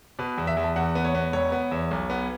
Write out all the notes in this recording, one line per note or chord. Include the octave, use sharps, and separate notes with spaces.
B2 B4
E2
E5
E2
A5
E2 F#5
B3
C#5
B3
E1 C#5
B3
E2
B1
B3